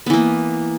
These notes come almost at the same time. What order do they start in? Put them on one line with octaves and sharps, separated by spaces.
B3 E3 A#3